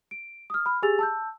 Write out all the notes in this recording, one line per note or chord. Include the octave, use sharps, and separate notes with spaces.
D7
D#6 F6
B5 F6
G4 G#4 G#5 E6 A6 F7
A5 E6 G6